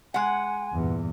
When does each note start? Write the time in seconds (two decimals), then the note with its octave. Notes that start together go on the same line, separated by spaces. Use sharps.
0.14 G#3 F#5 G#5
0.72 E2 G2 A#2